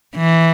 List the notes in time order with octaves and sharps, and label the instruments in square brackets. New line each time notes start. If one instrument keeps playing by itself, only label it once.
[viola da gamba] E3